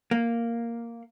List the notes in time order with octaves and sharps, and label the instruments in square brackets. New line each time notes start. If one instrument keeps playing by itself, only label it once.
[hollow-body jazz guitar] A#3